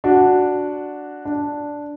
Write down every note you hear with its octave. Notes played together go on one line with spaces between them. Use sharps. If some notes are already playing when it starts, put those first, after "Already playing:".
D4 F#4
D4